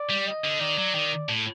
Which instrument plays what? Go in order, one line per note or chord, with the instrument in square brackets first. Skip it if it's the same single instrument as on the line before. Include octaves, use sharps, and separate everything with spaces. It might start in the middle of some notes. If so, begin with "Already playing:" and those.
Already playing: [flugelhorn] D5
[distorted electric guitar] G3
[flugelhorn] D#5
[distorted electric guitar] D3
[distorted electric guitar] D#3 [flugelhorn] D5
[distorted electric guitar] F#3
D#3
A2